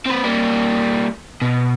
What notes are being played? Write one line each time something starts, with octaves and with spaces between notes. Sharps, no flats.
C4 B4
G3 A#3
B2